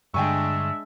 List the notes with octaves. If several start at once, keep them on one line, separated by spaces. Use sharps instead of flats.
G2 D3 G#3 D4 E5 G5 G#5 C#6